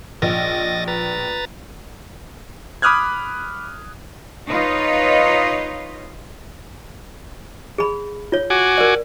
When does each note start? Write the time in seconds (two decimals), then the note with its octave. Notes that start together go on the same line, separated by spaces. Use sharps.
0.22 A#1 D#5 A6 A#6
0.88 B4 A#5 A6
2.82 B5 D6 D#6 F6 F#6 G#6
4.48 D#4 F4 B4 C#5 D#5
7.78 G#4 B5
8.32 F4 C#5
8.50 F#4 G#5 D6
8.78 A#4 D5